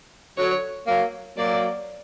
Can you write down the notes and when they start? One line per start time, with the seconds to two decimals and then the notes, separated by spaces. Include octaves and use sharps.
0.37 D3 F#3 C#5
0.87 F#3 A#3
1.37 F#3 A#3 D5